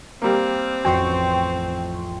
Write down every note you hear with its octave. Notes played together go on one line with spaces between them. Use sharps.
G3 A#3 C4
A1 F2 F#4 G5 C6 C#6